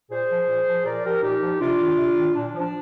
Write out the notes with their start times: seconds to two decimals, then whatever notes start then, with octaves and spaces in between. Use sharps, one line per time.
0.10 A#2 G#4 C5
0.29 F3
0.48 A#2
0.67 F3
0.85 A#2 A#4 D5
1.04 F3 G4 A#4
1.23 A#2 D#4 G4
1.42 F3
1.60 C3 D4 F4
1.80 D#3
1.98 C3
2.17 D#3
2.35 A#2 D4
2.55 F3
2.60 D4